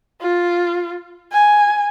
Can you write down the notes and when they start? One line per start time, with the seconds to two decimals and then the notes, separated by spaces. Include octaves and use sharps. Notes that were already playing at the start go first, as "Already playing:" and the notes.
0.21 F4
1.32 G#5